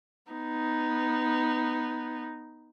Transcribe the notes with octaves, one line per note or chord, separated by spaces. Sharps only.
B3 D#4